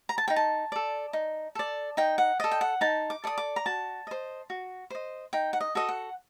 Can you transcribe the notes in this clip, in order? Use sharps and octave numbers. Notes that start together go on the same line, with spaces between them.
A#5
A5
D#4 G5
A5
A4 D5
D#4
A4 D5
D#4 G5
F#5
A4 D5 D#5
G5
F#5
D#4 A5
D6
A4 D5 D#6
D6
A#5
F#4 A5
C5 D#5
F#4
C5 D#5
D#4 G5
F#5
D#5
F#4 A4 D#5
F#5